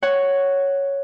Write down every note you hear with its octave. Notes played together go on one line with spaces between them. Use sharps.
C#5 F#5 C#6